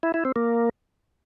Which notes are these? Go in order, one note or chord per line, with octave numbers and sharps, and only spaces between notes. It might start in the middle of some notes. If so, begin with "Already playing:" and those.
E4
E4
C4
A#3